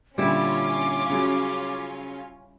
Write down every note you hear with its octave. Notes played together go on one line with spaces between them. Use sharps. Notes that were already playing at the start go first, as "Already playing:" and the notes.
A#2 D3 G3 C#4 E4 F4 D6
C#3 F#3